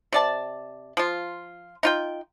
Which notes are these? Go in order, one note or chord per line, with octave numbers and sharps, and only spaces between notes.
C3 D5 A5
F3 F4
D#4 F4 G5